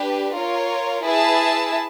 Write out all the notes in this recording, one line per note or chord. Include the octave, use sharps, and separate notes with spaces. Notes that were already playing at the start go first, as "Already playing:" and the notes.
Already playing: D4 G4 B4
F4 A#4 C#5
E4 G#4 B4 E5 A5